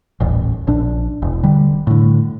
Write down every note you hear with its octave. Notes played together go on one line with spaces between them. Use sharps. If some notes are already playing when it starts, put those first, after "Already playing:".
D#1 A1
A#1 D4
E1
D3 G3
A2 D3